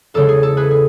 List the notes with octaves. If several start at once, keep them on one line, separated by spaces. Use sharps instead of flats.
E2 C#3 G#3 A4
G#4
A4
G#4 B4
G#4